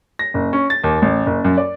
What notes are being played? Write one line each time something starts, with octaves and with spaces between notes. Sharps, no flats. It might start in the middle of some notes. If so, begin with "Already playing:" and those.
A#6
F#1
C#4
A6
D#2
A1
F#1
F#2
D5